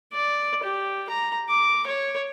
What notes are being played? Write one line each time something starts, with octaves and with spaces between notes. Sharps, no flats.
D5
G4
A#5
D6
C#5